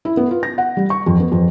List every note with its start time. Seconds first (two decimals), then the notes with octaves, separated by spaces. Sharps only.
0.05 E4
0.17 B3
0.31 F4
0.43 A#6
0.58 F#5
0.77 G3
0.90 C#6
1.06 F2
1.20 B3
1.32 F2